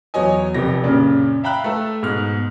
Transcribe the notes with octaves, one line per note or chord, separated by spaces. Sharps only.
E2 F#3 C#5 D#5 G#5
F1 C2 F2 G4 A#6
F#2 A#2 C#3 D4
E5 F5 G5 A#5 B5 F#6
A3 A4
G#2 B2 F6